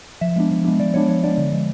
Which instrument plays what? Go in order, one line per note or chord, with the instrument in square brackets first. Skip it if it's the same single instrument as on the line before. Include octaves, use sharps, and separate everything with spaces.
[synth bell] F3 E5
G#3 B3 D4
F3
G#3 B3 D4
F3 D5
G#3 B3 D4 C#5
F3 C#5
G#3 B3 D4 D5
D3
F3 G#3